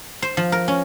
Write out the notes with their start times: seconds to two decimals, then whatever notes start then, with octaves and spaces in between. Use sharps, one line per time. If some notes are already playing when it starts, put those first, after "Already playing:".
0.22 C5
0.37 F3
0.52 A#4
0.68 C#4